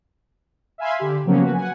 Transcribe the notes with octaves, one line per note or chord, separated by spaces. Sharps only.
E5 F5 G#5 B5 C6
D3 G4
C#3 F3 F#3 A#3 B3 C#4
F#4 B4
F#5 G#5